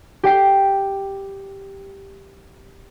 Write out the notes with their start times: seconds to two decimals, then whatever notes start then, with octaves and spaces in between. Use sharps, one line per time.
0.23 G4 G5 C7